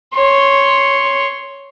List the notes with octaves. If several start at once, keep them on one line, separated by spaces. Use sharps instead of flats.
C#5 C6